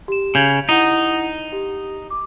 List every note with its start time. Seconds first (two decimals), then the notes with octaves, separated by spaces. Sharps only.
0.08 G4 E7
0.35 C#3 G6 G#6 F7
0.69 D#4 E4 F#5
1.52 G4
2.11 D6